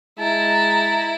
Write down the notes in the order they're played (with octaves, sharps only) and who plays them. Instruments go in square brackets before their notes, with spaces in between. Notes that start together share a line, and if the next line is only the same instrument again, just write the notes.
[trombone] G#3 [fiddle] E4 [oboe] A5 [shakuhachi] A#5